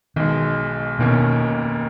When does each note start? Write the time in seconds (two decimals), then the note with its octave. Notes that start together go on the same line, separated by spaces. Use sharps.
0.16 B1 B2 D#3 G#3
0.99 F1 D#2 B2 D#3 A#3 C#4